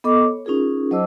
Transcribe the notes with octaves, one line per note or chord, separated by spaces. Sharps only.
B3 A4 D#5 C#6 D6
C#5
C#4 D#4 F4 G#4 A#4
F#3 C5 D#5 A5 D6 E6